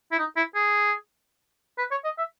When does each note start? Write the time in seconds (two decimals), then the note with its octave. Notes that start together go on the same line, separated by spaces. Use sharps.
0.12 E4
0.19 D#4
0.37 E4
0.55 G#4
1.78 B4
1.91 C#5
2.04 D#5
2.18 E5